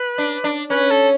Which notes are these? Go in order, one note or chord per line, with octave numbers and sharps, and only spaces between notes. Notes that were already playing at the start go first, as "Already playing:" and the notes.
Already playing: B4
D4
D4
C#4 B4
A4